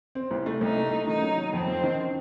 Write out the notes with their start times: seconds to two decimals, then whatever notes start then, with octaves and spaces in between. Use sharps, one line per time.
0.15 C4
0.31 C2
0.46 A3
0.61 C2 D#4
0.76 A3
0.92 A3
1.07 D#3 D#4
1.22 F#3
1.37 F#3
1.53 F2 C4
1.67 F2
1.84 D#3